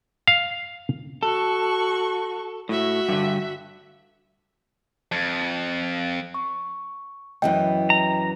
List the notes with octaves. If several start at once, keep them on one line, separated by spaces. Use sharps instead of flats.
F5
F#4 A4 C#6
A2 F#4 E5
G2 D3
F2
C#6
F#2 E3 B3 D#5 G5
A#5